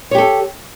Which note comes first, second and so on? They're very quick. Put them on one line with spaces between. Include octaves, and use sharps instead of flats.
C#5 G4 A4